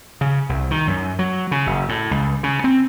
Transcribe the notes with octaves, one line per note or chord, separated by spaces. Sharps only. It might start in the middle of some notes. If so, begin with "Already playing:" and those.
C#3
C2
D#3
F#2
F#3
C#3
F#1
A2
C#2
C#3
C4